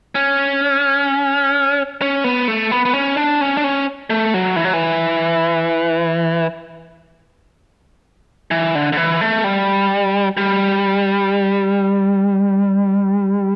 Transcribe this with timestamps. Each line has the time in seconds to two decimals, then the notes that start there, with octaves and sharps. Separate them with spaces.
0.15 C#4
2.01 C#4
2.24 B3
2.48 A3
2.71 B3
2.85 B3
2.94 C#4
3.17 D4
3.41 C#4
3.57 D4
3.64 C#4
4.10 A3
4.34 F#3
4.56 E3
4.65 F#3
4.73 E3
8.51 E3
8.75 D3
8.93 D3
8.97 E3
9.21 A3
9.44 G3
10.37 G3